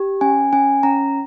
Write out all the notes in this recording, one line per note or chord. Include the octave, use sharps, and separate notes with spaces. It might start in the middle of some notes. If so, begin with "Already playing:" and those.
Already playing: G4
C#4 G#5
C#4 G#5
C#4 A#5